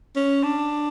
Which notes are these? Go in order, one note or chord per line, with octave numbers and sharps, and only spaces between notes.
C#4
D4